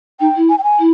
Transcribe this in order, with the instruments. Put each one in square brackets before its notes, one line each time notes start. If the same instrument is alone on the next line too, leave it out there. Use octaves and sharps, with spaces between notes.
[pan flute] D#4 [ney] G5
[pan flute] E4
[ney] G#5
G5
G#5
[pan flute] E4